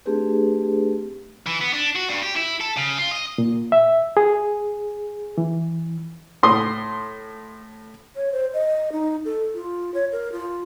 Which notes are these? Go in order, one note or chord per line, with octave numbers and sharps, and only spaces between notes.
A3 C4 D4 G4 G#4 B4
E3
B3
D4
F#4
G2
G4
E4
A4
C#3
F4
D#5
A#2
E5
G#4
E3
A2 C6 D#6
C#5
C5
D#5
D#4
A4
F4
C#5
A#4
F4